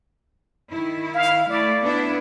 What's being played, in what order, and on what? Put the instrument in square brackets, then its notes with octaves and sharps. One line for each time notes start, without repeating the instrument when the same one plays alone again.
[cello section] D#3 E4
[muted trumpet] F5
[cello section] A3 E4 [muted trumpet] D5
[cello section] B3 D4 E4